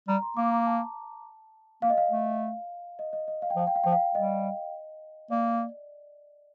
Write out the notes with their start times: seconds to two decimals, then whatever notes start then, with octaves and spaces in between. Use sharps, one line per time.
0.08 G3 A#5
0.22 C6
0.37 A#3 D6
0.52 A#5
0.66 A5
1.82 A#3 F5
1.90 D#5
1.98 F5
2.11 A3
2.99 D#5
3.13 D#5
3.28 D#5
3.42 F5
3.50 G5
3.56 F3 F5
3.67 G5
3.76 F5
3.84 F3 G5
3.92 F5
4.15 G3 D#5
5.30 A#3 D5